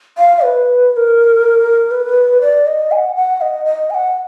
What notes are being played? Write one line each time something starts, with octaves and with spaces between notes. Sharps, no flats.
F5
B4
B4
A#4
B4
D5
D#5
G#5
F#5
F#5
D#5
D#5
G#5
F#5